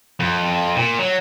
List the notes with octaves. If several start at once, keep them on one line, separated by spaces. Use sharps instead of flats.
F2
A#2
F#3